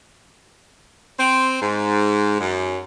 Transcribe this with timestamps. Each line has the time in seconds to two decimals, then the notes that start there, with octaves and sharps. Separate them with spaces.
1.18 C4
1.60 G#2
2.39 F#2